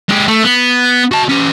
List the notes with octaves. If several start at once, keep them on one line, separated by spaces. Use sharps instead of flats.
G#3 G4
A3
B3
F#4 A5
C#4 G4